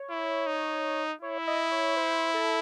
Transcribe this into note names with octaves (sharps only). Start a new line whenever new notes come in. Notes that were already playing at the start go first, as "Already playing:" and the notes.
Already playing: C#5
E4
D#4
E4 C#5
E5
D#5
C#5
C5
A4